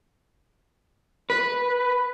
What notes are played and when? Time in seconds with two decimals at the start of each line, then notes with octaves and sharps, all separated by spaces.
1.30 B4